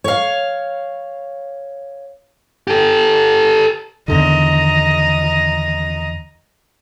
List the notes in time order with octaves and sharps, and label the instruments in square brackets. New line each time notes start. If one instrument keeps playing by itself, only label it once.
[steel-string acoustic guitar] C#5 F5
[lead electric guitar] G4 A4
[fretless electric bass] E2 D3 D#3 [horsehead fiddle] D#5 A#5